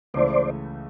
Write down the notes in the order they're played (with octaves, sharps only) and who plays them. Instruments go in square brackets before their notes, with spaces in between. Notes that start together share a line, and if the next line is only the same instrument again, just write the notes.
[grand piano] C#2 C#3 E3 A3 [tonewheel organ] C5 D5